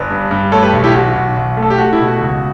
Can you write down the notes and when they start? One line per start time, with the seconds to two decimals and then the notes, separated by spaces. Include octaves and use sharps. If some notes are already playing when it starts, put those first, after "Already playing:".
Already playing: G1 B4 D5
0.10 G2
0.31 G2
0.52 A3 A4 C#5
0.63 G4 B4
0.73 B1
0.84 E4 G4
0.95 B1 F#4
1.16 B1
1.37 B1
1.57 A3
1.63 A4
1.70 G4
1.78 A3 F#4
1.93 E4 G4
2.00 B2
2.07 F#4
2.21 C#2